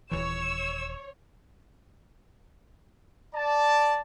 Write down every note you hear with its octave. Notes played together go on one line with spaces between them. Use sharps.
D#1 C#2 E3 C#5 E6 E7
D5 A5